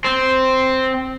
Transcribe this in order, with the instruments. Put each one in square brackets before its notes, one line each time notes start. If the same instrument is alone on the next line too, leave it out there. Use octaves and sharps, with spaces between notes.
[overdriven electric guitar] C4